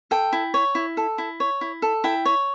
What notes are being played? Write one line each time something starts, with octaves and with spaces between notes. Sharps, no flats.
A4 G5
E4
C#5
E4
A4
E4
C#5
E4
A4
E4 G5
C#5